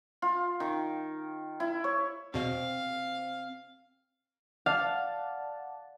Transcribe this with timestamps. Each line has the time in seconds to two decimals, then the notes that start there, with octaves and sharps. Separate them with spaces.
0.22 F4
0.60 D#3
1.60 E4
1.84 C#5
2.34 E2 B2 C4 F5
4.66 D5 F5 F#5 A5